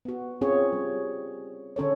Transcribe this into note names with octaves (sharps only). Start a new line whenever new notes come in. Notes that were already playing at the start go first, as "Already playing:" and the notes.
B3 F#4
C4 C#4 F4 G#4 C#5
G3
D3 C#4 A4 C#5